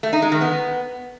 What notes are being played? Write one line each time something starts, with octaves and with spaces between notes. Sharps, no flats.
A3
D#4
G#3
D#3
B3